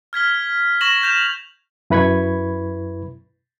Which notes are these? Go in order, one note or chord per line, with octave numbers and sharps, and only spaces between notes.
F6 G#6 B6 G7
C#6 A#6 E7 F#7
G6 A#6 E7 F7
F#2 E4 B4 B5 C#6 G#6